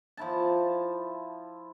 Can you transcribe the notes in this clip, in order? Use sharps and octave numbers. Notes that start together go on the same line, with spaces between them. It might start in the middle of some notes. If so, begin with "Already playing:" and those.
F3 E4 A5